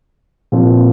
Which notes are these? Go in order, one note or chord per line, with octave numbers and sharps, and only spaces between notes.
A#2 F3 C4